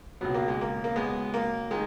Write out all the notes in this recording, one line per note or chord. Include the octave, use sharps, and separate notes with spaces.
C#2 B2 F#3 B3
A#3
G#3
A#3
A#3
G#3 B3
A#3
D#3 G#3